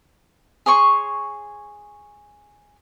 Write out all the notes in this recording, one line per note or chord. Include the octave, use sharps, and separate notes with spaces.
G#4 C#5 C6 C#6